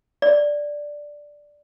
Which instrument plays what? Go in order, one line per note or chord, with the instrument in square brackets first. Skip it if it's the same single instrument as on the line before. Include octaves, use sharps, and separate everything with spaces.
[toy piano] D5